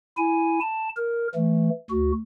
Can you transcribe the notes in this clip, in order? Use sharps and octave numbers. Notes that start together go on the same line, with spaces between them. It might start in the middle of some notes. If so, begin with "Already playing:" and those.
E4 G#5
A5
A#4
E3 A3
D2 F#4